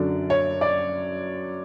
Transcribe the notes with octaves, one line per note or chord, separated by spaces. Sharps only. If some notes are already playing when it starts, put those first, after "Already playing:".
Already playing: F#2 D3 F#3 D5
C#5
D5